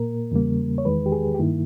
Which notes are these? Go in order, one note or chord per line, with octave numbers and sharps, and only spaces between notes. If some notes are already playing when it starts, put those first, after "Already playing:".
Already playing: A#2 A#3 A#4
E2 C#3 G3 A#3
C#5
E2 D#3 G#3 B4
G4
G#4
G4
G2 D#3 A#3 E4